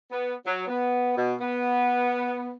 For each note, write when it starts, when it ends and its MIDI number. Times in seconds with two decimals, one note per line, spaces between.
0.11 0.33 59
0.46 0.63 54
0.67 1.13 59
1.16 1.33 47
1.40 2.53 59